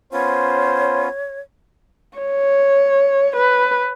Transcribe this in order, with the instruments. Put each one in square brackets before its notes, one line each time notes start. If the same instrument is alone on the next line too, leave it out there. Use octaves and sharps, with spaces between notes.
[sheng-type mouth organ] B3 C#4 F4 [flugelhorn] C5 [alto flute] C#5
[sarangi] C#5
B4